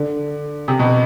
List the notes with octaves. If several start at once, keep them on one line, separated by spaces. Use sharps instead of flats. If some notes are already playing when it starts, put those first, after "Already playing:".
Already playing: D3
C3
B2